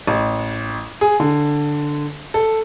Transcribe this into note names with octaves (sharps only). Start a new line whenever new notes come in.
A1
G#4
D3
A4